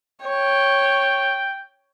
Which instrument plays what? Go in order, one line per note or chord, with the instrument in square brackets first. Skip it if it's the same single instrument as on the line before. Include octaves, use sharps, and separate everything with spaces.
[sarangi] C#5 [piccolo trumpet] G5